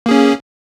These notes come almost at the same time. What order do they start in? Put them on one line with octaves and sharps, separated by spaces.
A#3 G#4 C#4